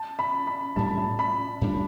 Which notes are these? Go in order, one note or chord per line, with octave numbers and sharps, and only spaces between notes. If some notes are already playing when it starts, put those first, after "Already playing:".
Already playing: A5
B5
B5
A2 G3 D4 A5
B5
A5
B5
A2 G3 D4